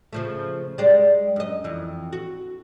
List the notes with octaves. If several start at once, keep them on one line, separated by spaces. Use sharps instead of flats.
C#3 F3 A3
G3 G#3 D5
F#2 D#5
F2 E3
F#4